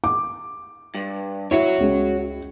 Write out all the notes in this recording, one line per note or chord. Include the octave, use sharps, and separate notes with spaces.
D6
G2
E4 F#4 C#5
C#2